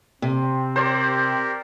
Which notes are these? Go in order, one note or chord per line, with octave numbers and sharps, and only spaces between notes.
C3 C4
G4 A#4 C5 D5